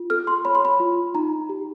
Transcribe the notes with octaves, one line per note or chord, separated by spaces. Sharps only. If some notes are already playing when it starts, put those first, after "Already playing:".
Already playing: F4
A4 F6
C6
C#5 B5
C6
B5
F4
D#4 A#5
G4